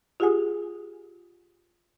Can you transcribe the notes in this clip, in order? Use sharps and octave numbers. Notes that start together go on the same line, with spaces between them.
F4 G4 G#4 F#5 G#5 D#6